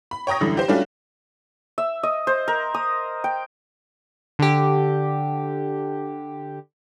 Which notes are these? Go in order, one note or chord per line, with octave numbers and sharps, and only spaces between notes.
B5
C#5 G5 A#5 D#6 A#6
F#2 D3 E3 G3
G4 C5
G3 A3 C#4 D4 F4 F#4
E5
D#5
C5
A#4
D#6
G5
D3 G4